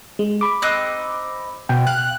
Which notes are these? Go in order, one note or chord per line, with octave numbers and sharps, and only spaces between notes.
G#3
B5 D6
C4 D#4 F#6
B2 G5
F5 F#6